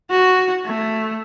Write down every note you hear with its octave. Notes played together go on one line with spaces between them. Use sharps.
F#4
A3